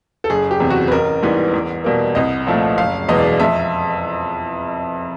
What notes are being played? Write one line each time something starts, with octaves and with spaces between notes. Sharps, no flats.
A4
F#1 G#4
G4
E2 C3
F#4
B4
A1 A#4
G#2 E3 G3 B3
E2
B2 G3 A#3
C2 D#5
A#2 F3 A3
F#1 F5
E2 B2 G#3 B3 D#5
D5
F2 E5